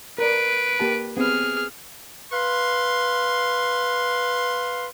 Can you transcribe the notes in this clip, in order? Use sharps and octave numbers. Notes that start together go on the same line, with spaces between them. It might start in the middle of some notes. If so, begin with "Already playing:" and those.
A#4 B4 D5 D7
A#3 G4 A5
B3 C4 G#4 B4 F6
B4 F5 C6